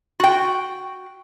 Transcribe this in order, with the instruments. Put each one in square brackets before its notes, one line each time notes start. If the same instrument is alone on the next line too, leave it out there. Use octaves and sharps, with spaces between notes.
[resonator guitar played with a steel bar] F#4 G5